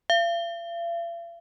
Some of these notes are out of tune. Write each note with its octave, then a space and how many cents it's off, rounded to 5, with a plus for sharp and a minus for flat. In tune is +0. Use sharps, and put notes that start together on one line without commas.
F5 -45